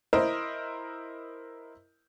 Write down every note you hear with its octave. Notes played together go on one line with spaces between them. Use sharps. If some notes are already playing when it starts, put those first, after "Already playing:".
E4 A#4 C5 D#5